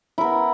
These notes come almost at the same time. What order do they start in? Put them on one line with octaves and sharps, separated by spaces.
E4 A#4 B3